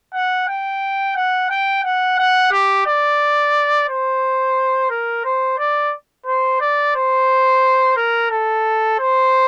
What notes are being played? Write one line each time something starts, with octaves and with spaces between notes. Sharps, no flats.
F#5
G5
F#5
G5
F#5
F#5
G4
D5
C5
A#4
C5
D5
C5
D5
C5
A#4
A4
C5